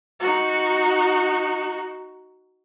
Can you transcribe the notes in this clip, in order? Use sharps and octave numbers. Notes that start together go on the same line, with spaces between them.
D#4 F#4